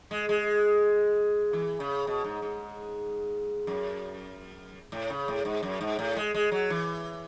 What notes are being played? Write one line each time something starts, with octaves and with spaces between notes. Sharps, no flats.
G#3
G#3
E3
C#3
B2
G#2
G#2
F#2
A2
C#3
A2
G#2
F#2
G#2
A2
G#3
G#3
F#3
E3